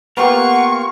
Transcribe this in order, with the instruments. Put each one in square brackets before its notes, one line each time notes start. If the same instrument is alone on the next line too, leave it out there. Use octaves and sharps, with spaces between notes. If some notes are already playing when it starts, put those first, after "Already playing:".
[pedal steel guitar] A#3 F4 A#4 [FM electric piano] B3 G4 [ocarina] F#5 [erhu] C#6